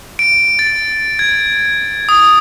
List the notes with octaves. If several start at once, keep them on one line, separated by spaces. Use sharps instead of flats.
D7
A6
G#6
D#6